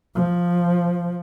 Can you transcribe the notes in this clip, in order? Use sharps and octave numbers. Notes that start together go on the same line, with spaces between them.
F3